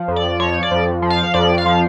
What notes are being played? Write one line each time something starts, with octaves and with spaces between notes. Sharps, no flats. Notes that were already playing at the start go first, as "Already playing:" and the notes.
Already playing: F3
F2
D5
F3 C#5
D5
F2
F3
F5
F2 D5
F5
F3